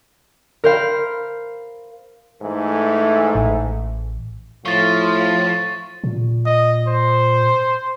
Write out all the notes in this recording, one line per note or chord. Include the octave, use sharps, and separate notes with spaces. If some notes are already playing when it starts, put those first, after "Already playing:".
A#4 C5 F5 B5
G#2 E3 A3
A1
A2 F3 F4 C#6 A6
A#2
D#5
C5